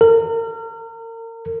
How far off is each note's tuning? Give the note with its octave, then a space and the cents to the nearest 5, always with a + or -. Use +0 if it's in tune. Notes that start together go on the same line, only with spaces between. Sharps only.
A#4 -35